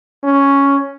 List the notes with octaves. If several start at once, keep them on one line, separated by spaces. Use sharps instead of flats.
C#4